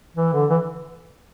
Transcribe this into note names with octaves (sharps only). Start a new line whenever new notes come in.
E3
D3
E3